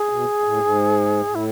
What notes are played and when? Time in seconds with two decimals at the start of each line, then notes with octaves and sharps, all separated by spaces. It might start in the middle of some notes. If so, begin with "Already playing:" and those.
Already playing: G#4
0.09 B2
0.44 A2
0.61 G#2
1.28 A2
1.35 E4